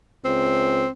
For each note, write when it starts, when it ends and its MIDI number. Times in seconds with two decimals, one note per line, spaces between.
0.25 0.84 37
0.25 0.89 60